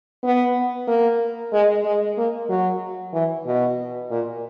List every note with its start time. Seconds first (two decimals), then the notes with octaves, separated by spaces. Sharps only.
0.24 B3
0.88 A#3
1.53 G#3
1.85 G#3
2.18 A#3
2.49 F#3
3.14 E3
3.46 B2
4.11 A#2